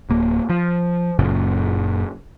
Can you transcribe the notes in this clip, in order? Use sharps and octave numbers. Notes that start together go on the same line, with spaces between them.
D1 A#3
F3
F#1 F#2 A#2 C#3